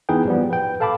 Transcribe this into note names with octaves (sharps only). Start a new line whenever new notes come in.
E3 B3 D#4 G#4 B4 G5
F3 G3 B3
B4 G5
A4 F5 A5 B5 D6